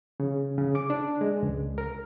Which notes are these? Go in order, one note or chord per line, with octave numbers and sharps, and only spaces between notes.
C#3
C#3
D6
D4
G#3
C#2
A#4